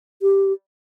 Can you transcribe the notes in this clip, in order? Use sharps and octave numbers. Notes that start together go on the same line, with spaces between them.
G4